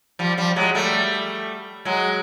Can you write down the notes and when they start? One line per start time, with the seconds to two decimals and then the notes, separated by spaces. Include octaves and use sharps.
0.19 F3 G3
0.38 F3 G3
0.56 F#3 G#3
0.75 G3 A3
1.85 F#3 G#3